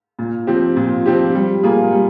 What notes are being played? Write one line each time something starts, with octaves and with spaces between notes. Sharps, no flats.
A#2
F3 C4 G4
A#2
F3 C4 G4
G3
A#3 F4 G#4
G3